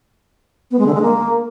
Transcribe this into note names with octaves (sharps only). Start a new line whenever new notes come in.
B3
G#3
D3
G#3
A#3